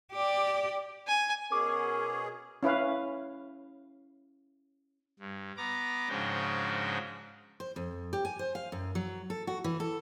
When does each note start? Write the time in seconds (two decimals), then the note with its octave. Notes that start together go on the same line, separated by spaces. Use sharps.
0.13 G4 D5
1.07 G#5
1.52 B2 C#4 G#4 A#4 D6
2.63 C#4 E4 B4 F5
5.19 G2
5.57 B3 A#5 D6
6.09 G#2 C#3 F3 D4 F#4 G5
7.60 C5
7.76 F2
8.13 G4
8.25 G#5
8.39 C5
8.55 F5
8.72 F#2
8.95 F#3
9.30 A4
9.47 F#4
9.64 E3
9.80 A4